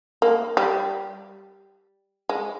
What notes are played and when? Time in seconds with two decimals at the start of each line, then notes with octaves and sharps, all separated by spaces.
0.22 A#3
0.57 G3
2.29 G#3